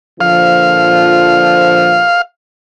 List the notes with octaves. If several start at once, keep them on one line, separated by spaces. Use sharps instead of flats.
A#2 D3 F3 F5